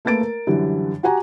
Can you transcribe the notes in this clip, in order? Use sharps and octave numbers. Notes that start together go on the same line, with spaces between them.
A3 A#3 B4 A6 D7
A#4
F#2 D3 E3 G3
F#4 G4 F#5 G#5 A#5